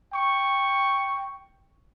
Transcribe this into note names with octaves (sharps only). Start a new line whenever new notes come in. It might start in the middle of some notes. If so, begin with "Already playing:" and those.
G5 C#6